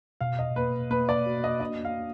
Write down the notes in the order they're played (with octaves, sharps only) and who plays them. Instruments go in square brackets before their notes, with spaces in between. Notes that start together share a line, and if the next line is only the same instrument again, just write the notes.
[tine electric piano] B2 [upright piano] F5
[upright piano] D#5
[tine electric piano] A#3 [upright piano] B4
[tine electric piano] A#3 [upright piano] B4
[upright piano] D5
[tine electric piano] F#4
[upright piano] D#5
[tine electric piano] D4 [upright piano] D#5
[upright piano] F5